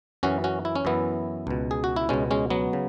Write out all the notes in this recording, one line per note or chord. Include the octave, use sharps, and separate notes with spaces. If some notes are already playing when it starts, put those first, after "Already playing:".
F#2 E3 C#4 F#4
C#4 F#4
E4
C#4
F#2 E3 B3 E4
C#2 B2
G#4
F#4
E4
C#2 B2 G#3 C#4
G#3 C#4
F#3 B3
C#3